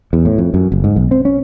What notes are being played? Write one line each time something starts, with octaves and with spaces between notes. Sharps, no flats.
E2
A2
F2
F#2
F#1
G#2
B1
C4
C#4